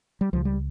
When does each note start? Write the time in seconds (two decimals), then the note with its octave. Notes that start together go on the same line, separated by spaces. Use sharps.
0.21 G3
0.33 C#2 C#3 F3
0.45 G3